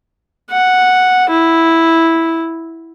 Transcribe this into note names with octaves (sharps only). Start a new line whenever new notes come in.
F#5
E4